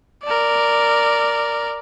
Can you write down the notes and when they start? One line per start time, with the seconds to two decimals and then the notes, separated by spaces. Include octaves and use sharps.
0.24 A#4 D5